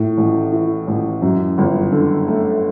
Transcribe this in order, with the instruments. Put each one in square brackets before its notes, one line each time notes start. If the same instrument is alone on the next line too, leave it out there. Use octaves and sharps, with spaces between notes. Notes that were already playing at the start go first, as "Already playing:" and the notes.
Already playing: [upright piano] A2
A1
E3
A1
F#2
G1
D3
A3